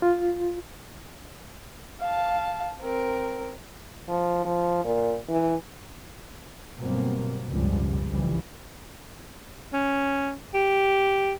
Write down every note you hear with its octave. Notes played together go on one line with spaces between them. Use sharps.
F4
F5 A5
C4 A#4
F3
F3
A#2
E3
G1 B2 F#3 G3 A#3 C4
F1 C#2 G2 B2 F3 G3
G1 C2 C#3 E3 F3 G3
C#4
G4